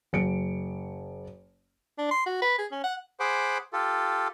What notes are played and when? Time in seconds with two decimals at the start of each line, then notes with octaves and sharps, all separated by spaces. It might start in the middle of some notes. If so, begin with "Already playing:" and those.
0.13 F#1 C#7 D7
1.98 D4
2.11 C6
2.26 F#4
2.42 B4
2.58 G#4
2.72 C#4
2.84 F#5
3.20 G#4 C5 F#5 B5 D6
3.73 F4 G4 A4